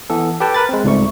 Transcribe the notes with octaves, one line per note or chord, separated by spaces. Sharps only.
E3 B3 A4
G4 A4 B4 G5 A5
A#4 B4 B5 A6
G#3 C4
C#2 G#2 C3 G3 A3 C#6